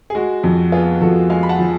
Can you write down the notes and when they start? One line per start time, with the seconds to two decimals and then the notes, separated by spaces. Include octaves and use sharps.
0.10 G#4
0.15 G#3 F#4
0.43 F2
0.72 B3 F4 G#4
1.01 F2 F#4 A4
1.30 G#3 F5 G#5
1.43 B5
1.49 F#5 A5
1.59 F3